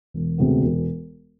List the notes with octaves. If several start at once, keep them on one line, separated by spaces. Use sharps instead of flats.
E1
D2 C3 G#3 B3
E1